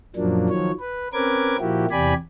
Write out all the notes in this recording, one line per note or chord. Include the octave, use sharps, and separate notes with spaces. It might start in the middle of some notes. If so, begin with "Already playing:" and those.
F#2 A#2 F3 F#3 A#3 D4
D#3 F3 F#3 C#5
B4
C4 C#4 A#4 B4 D6 G#6
A#2 F3 A#3 E4 F#4 G4
E2 C3 G4 D5 G#5 B5